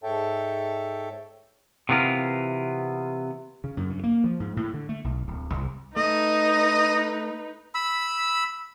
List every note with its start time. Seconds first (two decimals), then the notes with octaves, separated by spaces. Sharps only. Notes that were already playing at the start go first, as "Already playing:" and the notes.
0.03 G#2 A4 C#5 E5 G5 A5
1.89 C3 E3 B3 F4 A#4
3.64 C#3
3.77 F#2
3.90 G2
4.04 A#3
4.24 F3
4.40 G#2
4.57 A2
4.74 D3
4.89 A3
5.04 B1
5.27 D1
5.54 C2
5.96 A3 D#4 B4 D#5
7.75 B5 E6